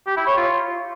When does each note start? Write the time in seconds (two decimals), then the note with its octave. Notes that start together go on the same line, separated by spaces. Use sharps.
0.07 G4
0.17 E4
0.27 C#5
0.37 F4